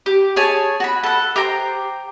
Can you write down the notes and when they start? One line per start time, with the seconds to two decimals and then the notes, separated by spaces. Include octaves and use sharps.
0.06 G4
0.36 G#4 C#5 G#5 A5
0.80 F#4 B5
1.03 A4 F#5
1.36 G4 C5 G5 A#5